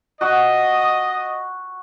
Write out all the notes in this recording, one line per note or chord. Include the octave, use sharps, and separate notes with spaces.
F#4 D#5